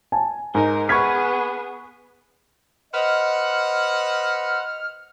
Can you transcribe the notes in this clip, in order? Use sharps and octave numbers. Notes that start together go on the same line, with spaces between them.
G#5 A5
G#2 D#4 A#4 G#5
B3 G#4 B5 C#6 F6 G#6 B6
B4 C5 D#5 F#5 F6